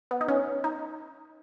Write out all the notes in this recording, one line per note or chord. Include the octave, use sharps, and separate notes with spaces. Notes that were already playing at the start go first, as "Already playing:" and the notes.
B3
D#4
C#4
D#4